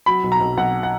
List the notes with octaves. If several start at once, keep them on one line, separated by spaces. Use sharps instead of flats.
F#3 B5
B1
A#5
B1
B1 F#5
F#5